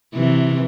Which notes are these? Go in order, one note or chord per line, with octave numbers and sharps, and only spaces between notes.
C3 E3